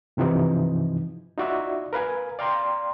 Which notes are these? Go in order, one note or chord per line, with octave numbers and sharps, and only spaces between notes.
G2 C3 E3 F3 D#4
D#4 F4 F#4 D5 E5
A#4 B4 F5 G#5
D5 F5 G5 A#5 C6